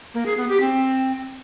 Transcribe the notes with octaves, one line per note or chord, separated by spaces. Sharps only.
A#3
G#4
B3
G4
C4